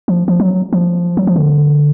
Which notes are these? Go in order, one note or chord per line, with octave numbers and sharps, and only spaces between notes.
F3
F3
F#3
F3
F#3
F3
D3